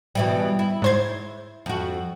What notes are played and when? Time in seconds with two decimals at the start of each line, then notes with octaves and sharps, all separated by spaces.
0.15 B2 E3 G3
0.59 E4
0.82 G#2 C5 G#6
1.66 F2 F#4